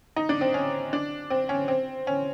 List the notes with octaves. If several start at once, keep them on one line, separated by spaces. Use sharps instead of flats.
D#4
D4
C4
C#4
D4
C4
C#4
C4
C#4